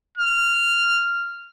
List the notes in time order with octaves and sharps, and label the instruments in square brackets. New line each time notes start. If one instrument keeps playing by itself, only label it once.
[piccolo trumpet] F6